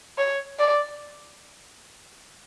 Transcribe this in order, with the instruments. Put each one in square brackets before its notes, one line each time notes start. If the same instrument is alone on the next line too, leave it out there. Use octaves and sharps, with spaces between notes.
[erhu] C#5
D5